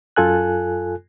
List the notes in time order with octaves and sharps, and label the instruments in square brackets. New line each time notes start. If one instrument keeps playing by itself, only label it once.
[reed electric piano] F#2 F4 A4 G#5 F#6